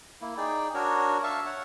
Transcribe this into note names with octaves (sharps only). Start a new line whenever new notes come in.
A#3 E4
D#4 G#4 D5 G5
D4 F#4 A#4 C#5
E5 F5 A5 C#6
C#5 F#5